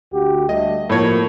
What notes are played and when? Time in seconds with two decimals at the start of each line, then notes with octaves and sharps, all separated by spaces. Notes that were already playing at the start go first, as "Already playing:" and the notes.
0.14 D2 F#4 G4
0.49 D2 G3 A3 D#5
0.90 A2 F3 A#3 C#5